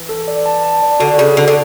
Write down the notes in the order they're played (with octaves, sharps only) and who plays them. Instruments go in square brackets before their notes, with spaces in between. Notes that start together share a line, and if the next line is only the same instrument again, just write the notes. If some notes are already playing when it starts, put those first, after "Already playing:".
Already playing: [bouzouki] E3
[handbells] A4
D5
A5
A5
D5
[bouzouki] D3 [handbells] F#4
[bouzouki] C#3 [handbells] F#4
[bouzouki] D3 [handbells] F#4
[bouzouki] D3